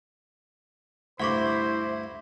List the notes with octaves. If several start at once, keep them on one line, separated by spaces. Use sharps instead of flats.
D2 G2 E4 C5 F#5 C#6 D6